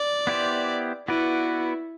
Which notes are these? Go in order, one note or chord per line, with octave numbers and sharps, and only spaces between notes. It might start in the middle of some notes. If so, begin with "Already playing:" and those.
Already playing: D5
B3 E4 G4 C5
B3 E4 F#4 B4 D5